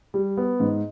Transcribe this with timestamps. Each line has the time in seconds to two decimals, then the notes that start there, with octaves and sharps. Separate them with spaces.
0.14 G3
0.37 B3
0.60 G#2